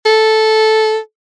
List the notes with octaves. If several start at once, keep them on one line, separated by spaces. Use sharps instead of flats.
A4